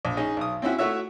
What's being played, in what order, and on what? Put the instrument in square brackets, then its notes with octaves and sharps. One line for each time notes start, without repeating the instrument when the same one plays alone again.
[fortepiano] A#1
C#4 D#4 G#4
B1 D#6
C4 C#4 E4 F#4
A3 E4 F#4 C#5 E5